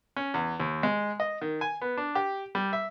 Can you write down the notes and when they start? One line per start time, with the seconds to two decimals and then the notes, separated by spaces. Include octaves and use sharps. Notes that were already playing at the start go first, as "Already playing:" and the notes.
0.16 C#4
0.34 E2
0.60 D#2
0.83 G#3
1.20 D#5
1.41 D#3
1.61 G#5
1.81 B3
1.97 D4
2.15 G4
2.55 G3
2.73 E5